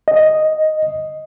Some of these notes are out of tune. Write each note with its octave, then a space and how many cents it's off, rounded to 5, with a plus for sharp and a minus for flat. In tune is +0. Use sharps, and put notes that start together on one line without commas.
D#5 +0